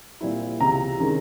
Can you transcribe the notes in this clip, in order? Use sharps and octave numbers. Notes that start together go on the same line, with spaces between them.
A#2 G3 C4 E4
C#2 C3 E3 A#5
C3 D#3 G#3 C#4